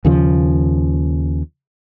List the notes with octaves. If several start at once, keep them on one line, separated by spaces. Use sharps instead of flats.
D#2 C#3 F3